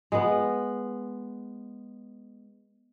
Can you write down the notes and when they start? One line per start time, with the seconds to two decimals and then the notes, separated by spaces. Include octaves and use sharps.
0.12 G#3 B3